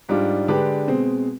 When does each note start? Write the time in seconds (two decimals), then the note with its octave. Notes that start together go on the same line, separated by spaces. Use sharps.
0.09 G#2 G3 D4 F4
0.48 D3 G#3 D4 G4 B4
0.87 B2 G#3 C4